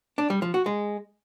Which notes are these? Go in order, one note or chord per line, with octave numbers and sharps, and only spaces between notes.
D4
G3
F3
F#4
G#3